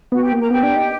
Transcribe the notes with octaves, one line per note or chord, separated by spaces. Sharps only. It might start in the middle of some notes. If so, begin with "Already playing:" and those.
B3 F#4 F#5
G4 G5
A#3
A#4 A#5
B3 G4 G5
D4
D#4